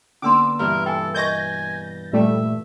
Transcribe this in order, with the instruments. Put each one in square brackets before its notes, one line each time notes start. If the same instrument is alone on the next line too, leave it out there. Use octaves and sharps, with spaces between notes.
[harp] D3 A#3 B3 [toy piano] C#4 D4 C6 [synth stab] D6 E6
[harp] G2 B2 E3 [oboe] A#4
[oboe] A4 [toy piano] G5 G#5
[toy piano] A#4 D#5 C#6 [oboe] G#5 [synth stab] G6 A6 A#6
[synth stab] A#2 G3 A3 [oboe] E5